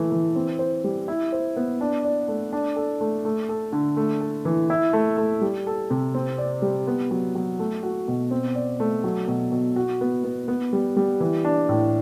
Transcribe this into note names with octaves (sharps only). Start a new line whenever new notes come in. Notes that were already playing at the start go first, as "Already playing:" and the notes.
Already playing: E3 A3
E3
C4
C5
G3
E4
C5
B3
D4
D5
A3
D4
A4
A3
A3
A4
D3
A3
A4
E3
E4
A3
A3
G3
A4
C3
C4
D5
G3
B3
F#3
F#3
A3
F#4
B2
C4
D5
A3
F#3
B2
B2
F#4
B3
B3
B3
G3
G3
E3
D4
A2